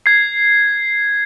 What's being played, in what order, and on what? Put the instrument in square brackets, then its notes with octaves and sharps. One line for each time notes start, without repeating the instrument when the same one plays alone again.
[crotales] G#6 C7